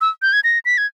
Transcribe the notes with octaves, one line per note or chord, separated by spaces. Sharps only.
E6
G6
G#6
A#6
B6
G#6